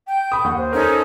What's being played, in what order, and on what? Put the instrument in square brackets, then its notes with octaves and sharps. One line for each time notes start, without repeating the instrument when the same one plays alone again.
[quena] G5 [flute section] G6
[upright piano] B5 D#6
[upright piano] D#2 [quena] F#5
[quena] C5
[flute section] C#4 D#4 A4 [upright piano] A#4